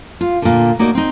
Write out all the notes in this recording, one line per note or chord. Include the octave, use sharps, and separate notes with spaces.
F4
A#2 D3
A#3 D#4 F#4 D5
C4 D#4